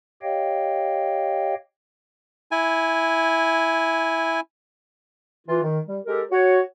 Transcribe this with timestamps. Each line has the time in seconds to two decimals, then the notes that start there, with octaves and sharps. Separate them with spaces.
0.22 G4 C#5 D#5 F5 G5
2.51 E4 G#5
5.47 E3 F4
5.62 D#3
5.87 G3
6.06 G#3 G4 A4 A#4
6.32 F#4 C#5